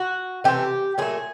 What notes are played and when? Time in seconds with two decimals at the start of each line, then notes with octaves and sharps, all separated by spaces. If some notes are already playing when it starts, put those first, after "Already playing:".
Already playing: F#4
0.44 C3 E3 A3 G4
0.98 A#2 F#3 A3 G#4